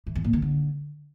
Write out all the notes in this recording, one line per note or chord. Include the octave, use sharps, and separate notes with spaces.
E3
E2
A#2
D#3
D3